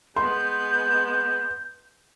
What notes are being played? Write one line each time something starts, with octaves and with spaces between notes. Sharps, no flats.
G#3 B3 C6 G6